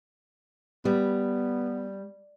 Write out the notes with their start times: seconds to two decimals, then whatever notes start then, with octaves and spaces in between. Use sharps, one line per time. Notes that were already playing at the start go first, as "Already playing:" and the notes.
0.85 G3 B3